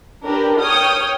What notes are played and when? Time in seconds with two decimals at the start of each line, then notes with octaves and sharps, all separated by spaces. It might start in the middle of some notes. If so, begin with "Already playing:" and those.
0.24 D4 G4 A#4 B4
0.60 C#5 G5 D#6 F6